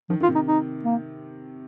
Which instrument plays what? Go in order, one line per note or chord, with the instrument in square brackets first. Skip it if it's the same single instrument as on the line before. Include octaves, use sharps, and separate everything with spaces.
[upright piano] D#3 [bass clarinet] F3
[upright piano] D#3 [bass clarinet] F4
[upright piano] C3
[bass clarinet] D#4
D#4
A#3